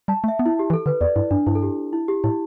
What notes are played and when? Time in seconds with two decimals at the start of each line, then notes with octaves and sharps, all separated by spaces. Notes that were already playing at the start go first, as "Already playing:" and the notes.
0.08 G3 A5
0.24 A3
0.28 E5
0.39 B3
0.46 E4
0.59 G4
0.70 E3
0.73 A4
0.86 D3 B4
1.01 E2 D5
1.16 G2 E4
1.31 G2 D4
1.47 G2 E4
1.55 A4
1.63 G4
1.93 E4
2.08 G4
2.24 A2 E4